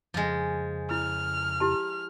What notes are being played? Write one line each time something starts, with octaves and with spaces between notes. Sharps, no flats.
F2 C#3 F3 G#3
E4 F6
E4 G4 A5